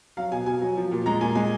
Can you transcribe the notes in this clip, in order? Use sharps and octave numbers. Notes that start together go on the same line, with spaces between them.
F#3 F5
B2 G#5
B2 G#5
F#3
F3
A#2
G#3 A#5
A#2 G#5
G#3 G#5